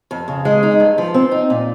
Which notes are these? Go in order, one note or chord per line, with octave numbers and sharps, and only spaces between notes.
F2
C#3
G#3
D#4
G2
F3
C4
D#4
A#2